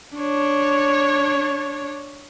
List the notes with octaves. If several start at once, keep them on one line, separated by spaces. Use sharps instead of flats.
D4 C#5